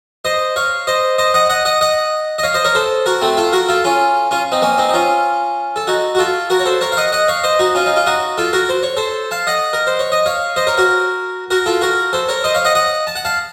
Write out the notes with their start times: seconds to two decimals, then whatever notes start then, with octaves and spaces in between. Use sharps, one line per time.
0.25 C5 D#5
0.56 C#5 F5
0.87 C5 D#5
1.18 C5 D#5
1.34 D#5 F#5
1.50 D#5 F#5
1.65 D#5 F#5
1.81 D#5 F#5
2.38 D#5
2.43 C#5 F5
2.54 C5 D#5
2.65 A#4 C#5
2.75 A4 C5
3.06 F#4 A#4
3.21 A3 C4
3.37 F4 A4
3.53 F#4 A#4
3.69 F4 A4
3.84 C#4 F4
4.31 C#4 F4
4.52 C4 D#4
4.62 A#3 C#4
4.78 C4 D#4
4.89 D#4
4.94 C#4 F4
5.76 A4
5.87 D#4 F#4
6.15 F#4
6.19 F4 A4
6.50 F#4 A#4
6.59 C#5
6.65 A4 C5
6.81 A#4 C#5
6.92 F5
6.97 D#5 F#5
7.12 D#5 F#5
7.28 C#5 F5
7.44 C5 D#5
7.59 D#4 F#4
7.75 C#4 F4
7.86 D#4
7.96 F4
8.06 D#4 F#4
8.38 F4 A4
8.53 F#4 A#4
8.69 C5
8.83 C#5
8.97 A4 C5
9.31 F5 A5
9.47 D#5 F#5
9.73 A#4
9.87 C5
9.99 C#5
10.12 D#5
10.26 C#5 F5
10.56 C5 D#5
10.67 A#4 C#5
10.77 F#4 A#4
11.51 F#4 A#4
11.66 F4 A4
11.81 F#4 A#4
12.13 A4 C5
12.29 A#4 C#5
12.44 C5 D#5
12.54 C#5 F5
12.65 D#5 F#5
12.75 D#5 F#5
13.07 A5
13.15 F#5
13.25 F5 A5